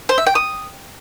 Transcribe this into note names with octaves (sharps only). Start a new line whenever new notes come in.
C5
E5
G5
D#6